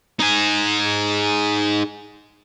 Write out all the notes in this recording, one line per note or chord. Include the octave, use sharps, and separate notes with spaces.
D#4 G#4